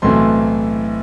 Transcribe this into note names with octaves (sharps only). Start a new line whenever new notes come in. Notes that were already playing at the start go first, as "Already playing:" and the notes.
B1 A2 E3 A3 C4 C6